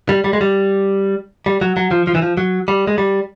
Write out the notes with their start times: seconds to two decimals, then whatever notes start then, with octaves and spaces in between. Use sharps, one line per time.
0.09 G3
0.24 G3
0.33 G#3
0.41 G3
1.46 G3
1.61 F#3
1.77 F#3
1.91 F3
2.07 F3
2.15 E3
2.22 F3
2.37 F#3
2.68 G3
2.87 G#3
2.98 G3